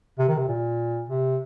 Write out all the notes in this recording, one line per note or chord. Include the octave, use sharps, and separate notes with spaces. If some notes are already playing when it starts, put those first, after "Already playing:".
C3
D#3
C3
A#2
C3